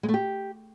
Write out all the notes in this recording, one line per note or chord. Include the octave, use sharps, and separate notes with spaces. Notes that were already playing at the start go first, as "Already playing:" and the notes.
G#3
A3
G4